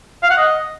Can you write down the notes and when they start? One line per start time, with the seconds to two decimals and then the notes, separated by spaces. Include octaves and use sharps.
0.23 F5
0.30 F#5
0.38 D#5